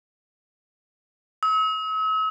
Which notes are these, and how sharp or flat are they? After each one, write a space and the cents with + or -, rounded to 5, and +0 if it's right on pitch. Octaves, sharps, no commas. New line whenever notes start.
E6 -45